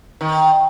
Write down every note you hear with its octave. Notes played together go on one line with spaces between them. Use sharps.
D#3